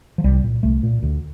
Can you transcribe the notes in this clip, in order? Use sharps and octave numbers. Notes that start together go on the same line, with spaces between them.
F3
C2 G3
A#2
C2 A3
A#2
D2